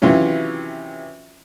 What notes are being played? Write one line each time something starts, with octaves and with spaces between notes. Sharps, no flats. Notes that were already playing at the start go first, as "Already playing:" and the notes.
C3 D#3 E3 F#3 C#4 F4